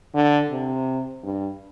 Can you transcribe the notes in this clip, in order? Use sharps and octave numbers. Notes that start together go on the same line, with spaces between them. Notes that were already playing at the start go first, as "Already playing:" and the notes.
D3
C3
G2